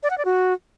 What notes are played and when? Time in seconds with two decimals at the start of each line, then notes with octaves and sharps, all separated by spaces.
0.03 D5
0.10 F#5
0.18 D5
0.25 F#4